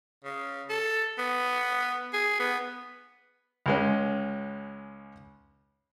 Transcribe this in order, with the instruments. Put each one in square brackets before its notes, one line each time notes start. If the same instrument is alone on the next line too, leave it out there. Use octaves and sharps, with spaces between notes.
[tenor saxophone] C#3
A4
B3
G#4
B3
[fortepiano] C#2 G#3 C#4